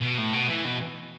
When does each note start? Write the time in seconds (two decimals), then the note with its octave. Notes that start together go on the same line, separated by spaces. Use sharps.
0.01 B2
0.17 A2
0.33 B2
0.49 E3
0.65 B2